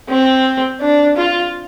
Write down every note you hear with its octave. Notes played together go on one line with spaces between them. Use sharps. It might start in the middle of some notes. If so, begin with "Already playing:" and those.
C4
D4
F4